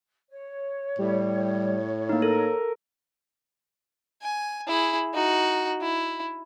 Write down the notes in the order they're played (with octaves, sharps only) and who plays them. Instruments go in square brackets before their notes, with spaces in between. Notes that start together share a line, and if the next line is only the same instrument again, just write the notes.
[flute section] C#5
[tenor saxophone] A2 [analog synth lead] G3
[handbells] A#3 D#4
[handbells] A4 [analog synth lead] A#4
[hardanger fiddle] G#5
E4 G#4
D#4 F#4
E4